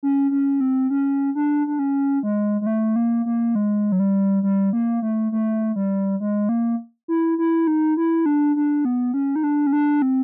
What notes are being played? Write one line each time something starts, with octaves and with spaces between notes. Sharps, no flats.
C#4
C#4
C4
C#4
D4
D4
C#4
G#3
G#3
A3
A#3
A#3
G#3
F#3
G3
G3
A#3
A3
A3
G3
G#3
A#3
E4
E4
D#4
E4
D4
D4
B3
C#4
D#4
D4
C#4
D4
C4